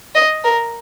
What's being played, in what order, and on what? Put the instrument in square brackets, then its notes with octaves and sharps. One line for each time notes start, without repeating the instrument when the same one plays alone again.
[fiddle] D#5
A#4